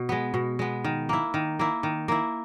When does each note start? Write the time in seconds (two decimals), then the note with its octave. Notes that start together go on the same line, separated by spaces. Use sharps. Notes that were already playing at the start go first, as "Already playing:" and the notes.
Already playing: B2
0.09 G#3 B3
0.34 B2
0.59 G#3 B3
0.84 D#3
1.09 A#3 E4
1.34 D#3
1.59 A#3 E4
1.83 D#3
2.08 A#3 E4